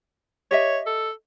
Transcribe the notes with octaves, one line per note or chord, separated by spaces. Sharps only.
G4 C#5 D#5 E5
A4